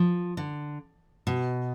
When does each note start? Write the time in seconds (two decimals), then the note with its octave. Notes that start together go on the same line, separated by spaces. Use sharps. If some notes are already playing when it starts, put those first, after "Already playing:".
Already playing: F3
0.37 D3
1.27 B2